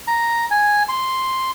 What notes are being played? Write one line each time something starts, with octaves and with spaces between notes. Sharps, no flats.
A#5
G#5
C6